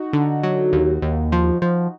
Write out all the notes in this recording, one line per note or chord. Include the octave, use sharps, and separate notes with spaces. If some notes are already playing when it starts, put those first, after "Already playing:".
Already playing: D#4 F#4
D3
F#3
D#2
D#2
F3
F3